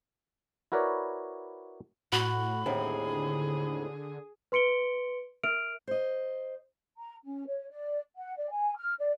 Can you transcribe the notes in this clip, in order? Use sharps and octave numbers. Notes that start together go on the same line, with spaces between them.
E4 F#4 A#4 B4 C#5 D5
A2 F#4 B5
D#2 A2 D3 C4 G#4
B4 C6 C#7 D7 G7
A#4 E5 F6 D7 F7
C5 D#5
A#5
C#4
C#5
D5
F#5
D5
G#5
F6
D5